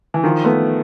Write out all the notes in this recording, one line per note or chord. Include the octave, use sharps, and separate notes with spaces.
E3
D#3 F3
A3 B3